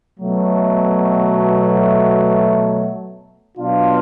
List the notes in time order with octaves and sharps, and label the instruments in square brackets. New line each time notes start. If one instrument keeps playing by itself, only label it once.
[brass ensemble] B2 F#3 A3
B2 F#3 B3 D4 F4